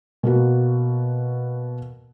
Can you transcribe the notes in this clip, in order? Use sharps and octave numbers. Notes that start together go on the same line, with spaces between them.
B2 A#3 F#4